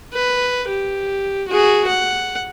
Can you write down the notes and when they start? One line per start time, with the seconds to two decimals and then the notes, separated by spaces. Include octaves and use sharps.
0.14 B4
0.69 G4
1.48 F#4 G#4
1.88 F#5